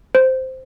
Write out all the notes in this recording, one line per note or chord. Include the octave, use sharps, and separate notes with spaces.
C5